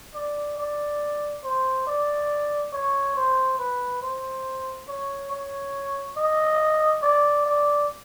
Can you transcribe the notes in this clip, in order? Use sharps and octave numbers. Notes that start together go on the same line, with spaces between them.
D5
D5
C5
D5
C#5
C5
B4
C5
C#5
C#5
D#5
D5
D5